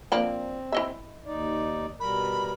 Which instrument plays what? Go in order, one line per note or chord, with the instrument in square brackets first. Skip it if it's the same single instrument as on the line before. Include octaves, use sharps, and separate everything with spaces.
[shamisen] F3 A#3 D4 [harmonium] C4
[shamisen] E4 D#5 E5
[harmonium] D#2 D#4 D5
[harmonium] B2 G3 A#4 [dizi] B5